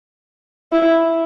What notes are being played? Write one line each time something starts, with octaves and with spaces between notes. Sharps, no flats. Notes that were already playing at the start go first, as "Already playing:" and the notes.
E4